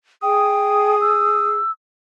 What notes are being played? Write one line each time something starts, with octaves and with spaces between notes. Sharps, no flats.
G#4 G5 D#6
E6